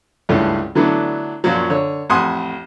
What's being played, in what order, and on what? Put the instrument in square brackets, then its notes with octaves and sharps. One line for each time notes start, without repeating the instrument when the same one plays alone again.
[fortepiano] C#2 G2 E3 A3 C#4
D3 E3 F#3 A3 B3 D4
F#2 A#2 F3 F#3
D3 C#5
A1 F2 F#5 G#5 C6 D#6